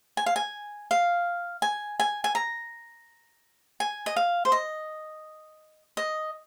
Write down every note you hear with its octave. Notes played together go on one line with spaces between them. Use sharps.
G#5
F5
G#5
F5
G#5
G#5
G#5
A#5
G#5
D#5
F5
C5
D#5
D#5